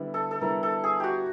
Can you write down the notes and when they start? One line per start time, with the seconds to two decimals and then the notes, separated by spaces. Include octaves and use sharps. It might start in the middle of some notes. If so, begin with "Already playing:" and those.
Already playing: D3 G3 B3 E4
0.14 A4
0.31 A4
0.41 D3 G3 B3 E4 A#4
0.63 A4
0.84 G#4
1.00 F#4 G4